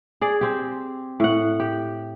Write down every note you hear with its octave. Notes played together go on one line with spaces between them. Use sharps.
G#4 D5
C4 G4
A2 F#5
G4